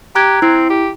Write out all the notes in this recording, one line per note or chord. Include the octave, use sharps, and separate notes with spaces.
G4 A#5 F#6 G#6
C4 E4
G4